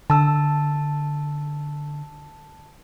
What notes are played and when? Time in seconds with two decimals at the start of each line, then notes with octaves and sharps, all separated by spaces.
0.10 D3 A5 E6